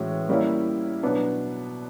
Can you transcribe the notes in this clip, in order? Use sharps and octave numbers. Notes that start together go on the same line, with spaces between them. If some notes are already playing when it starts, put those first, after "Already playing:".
Already playing: A2 E3 G#3 C#4 F#4
G3 A#3 C#4 E4
B2 F#3 B3 D4